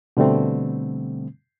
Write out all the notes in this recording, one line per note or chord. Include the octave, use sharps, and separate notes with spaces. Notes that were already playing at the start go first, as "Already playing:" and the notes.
B2 D3 G3 A3 C4